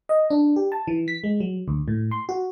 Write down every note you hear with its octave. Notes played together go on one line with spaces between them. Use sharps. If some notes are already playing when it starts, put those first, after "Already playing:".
D#5
D4
G4
A5
E3
B6
G#3
F#3
D2
A2
C6
F#4